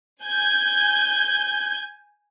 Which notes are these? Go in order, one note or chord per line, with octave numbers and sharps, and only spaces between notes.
G#5 G6 G#6